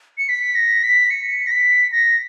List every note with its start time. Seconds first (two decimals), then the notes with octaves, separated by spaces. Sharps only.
0.18 C#7
0.29 B6
0.55 A#6
0.83 B6
1.11 C#7
1.47 A#6
1.51 B6
1.92 A#6